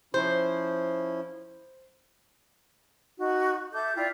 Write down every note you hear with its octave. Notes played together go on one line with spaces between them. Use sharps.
F3 C#4 E4 C5
D#4 F#4
A4 E5 D6 G6
E4 F4 D5 G5